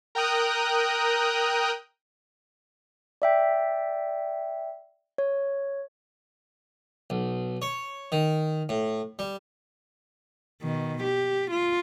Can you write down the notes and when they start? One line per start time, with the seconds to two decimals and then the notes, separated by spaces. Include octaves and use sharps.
0.15 A#4 G5 A#5 D#6 F#6
3.22 D5 E5 G5
5.18 C#5
7.10 B1
7.62 C#5
8.12 D#3
8.69 A2
9.19 G3
10.62 B2 D#3
11.03 G4
11.51 F4